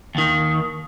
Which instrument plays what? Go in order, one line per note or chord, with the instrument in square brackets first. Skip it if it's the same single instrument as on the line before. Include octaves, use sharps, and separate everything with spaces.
[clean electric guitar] D#2 D#3